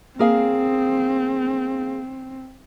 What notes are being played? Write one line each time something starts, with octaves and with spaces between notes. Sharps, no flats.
A#3 C4 G#4 F5